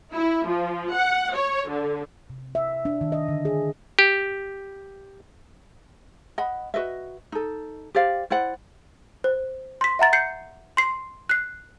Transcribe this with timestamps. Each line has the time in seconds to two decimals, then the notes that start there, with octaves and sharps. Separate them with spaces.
0.14 E4
0.48 F3
0.93 F#5
1.34 C#5
1.69 D3
2.30 C3
2.55 E5
2.85 D4
3.01 D#3
3.12 D#5
3.28 D3
3.45 G#4
3.99 G4
6.38 D#5 F#5 B5
6.74 F#4 B4 D#5 E5
7.32 D#4 A4
7.95 G4 C5 D5 F5
8.30 E4 C5 D5 F#5
9.24 C5
9.81 C6 B6
9.99 E5 F#5 A#5 A6
10.13 G6 C7 C#7
10.77 C6 C7
11.29 F#6 C7